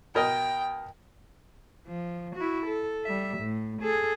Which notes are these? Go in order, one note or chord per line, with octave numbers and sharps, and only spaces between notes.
B2 A#4 D#5 G5
F3
E4 F#4
A4
G3 E5
A2
G#4 A4